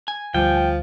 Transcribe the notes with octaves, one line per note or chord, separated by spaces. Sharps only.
G#5
D2 F3 G3 G5